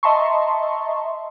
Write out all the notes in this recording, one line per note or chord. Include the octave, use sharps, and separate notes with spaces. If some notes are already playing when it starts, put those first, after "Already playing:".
D#5 E5 A5 A#5 C6 C#6